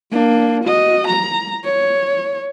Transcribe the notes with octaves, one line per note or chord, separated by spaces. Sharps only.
A#3 D4
F#4 D#5
A#5
C#5